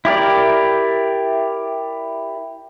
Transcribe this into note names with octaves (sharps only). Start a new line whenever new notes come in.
E4 G4 A#4 D5